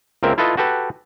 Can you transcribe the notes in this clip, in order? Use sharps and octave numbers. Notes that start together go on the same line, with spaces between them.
C#2 A#3 C4 A#4 E5
E4 F4 A4 B4 D#5
F#4 G4 A4 B4